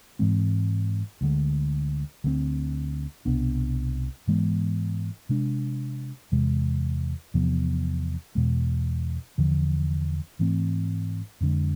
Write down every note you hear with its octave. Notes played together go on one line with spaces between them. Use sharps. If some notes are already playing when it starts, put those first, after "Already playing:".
G#2 E3 G#3 C4
D2 D3 G#3
D2 D3 A3 C4
C2 B2 B3 D4
G#2 E3 G#3 B3
C3 G#3 D4
E2 C3 G#3
E2 C3 F3 B3
E2 B2 G#3 B3
E2 D3 F3
G#2 E3 A3 C4
F2 D3 G#3